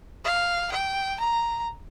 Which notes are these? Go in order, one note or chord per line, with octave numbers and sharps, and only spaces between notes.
F5
G5
A#5